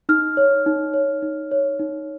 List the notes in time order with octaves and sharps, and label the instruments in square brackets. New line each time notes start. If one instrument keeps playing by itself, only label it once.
[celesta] D#4 F6
C#5
D#4
C#5
D#4
C#5
D#4